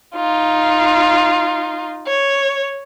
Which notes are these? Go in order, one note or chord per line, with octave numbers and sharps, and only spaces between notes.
D#4 F4
C#5